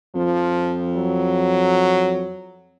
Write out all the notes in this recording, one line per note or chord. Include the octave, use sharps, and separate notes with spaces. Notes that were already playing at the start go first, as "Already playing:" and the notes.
F2 F3
F#3